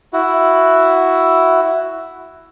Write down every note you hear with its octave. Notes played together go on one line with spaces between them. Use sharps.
E4 F#4